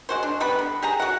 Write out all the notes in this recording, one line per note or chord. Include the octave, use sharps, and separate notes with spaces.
G#3 F#4 C5
D4
G3 B3 B4 B5
D3
G4 G#4 A#5
F#4 F#5